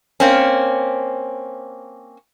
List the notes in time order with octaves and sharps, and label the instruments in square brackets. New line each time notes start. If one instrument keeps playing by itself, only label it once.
[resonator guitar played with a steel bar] A#3 C4 C#4